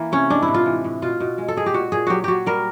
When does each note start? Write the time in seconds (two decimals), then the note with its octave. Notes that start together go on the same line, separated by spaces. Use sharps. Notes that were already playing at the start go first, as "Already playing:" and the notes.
Already playing: E3 A#3
0.12 C3 C#4
0.30 G#3 D4
0.42 E4
0.48 A2
0.54 F4
0.66 E3
0.84 A2
1.02 B2 F4
1.20 B2
1.38 G#3
1.48 A4
1.56 G#3 G#4
1.66 G4
1.74 A#2 F#4
1.92 A#2 G#4
2.07 F#3 F#4 G4
2.24 F#3 F#4 G4
2.46 G3 A#4